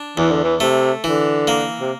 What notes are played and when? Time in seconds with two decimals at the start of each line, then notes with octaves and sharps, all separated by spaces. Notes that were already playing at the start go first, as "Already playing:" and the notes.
Already playing: D4
0.17 E2 E3
0.31 D3
0.43 E3
0.60 C3 A3
1.04 D3 E3
1.48 A#3
1.80 C3